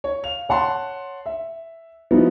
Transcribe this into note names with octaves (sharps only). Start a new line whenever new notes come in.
C#5
F5 F7
C#5 F#5 A5 C6
E5
F3 G3 B3 D#4 E4 F#4